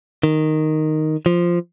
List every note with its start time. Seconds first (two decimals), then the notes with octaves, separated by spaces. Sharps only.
0.23 D#3
1.26 F3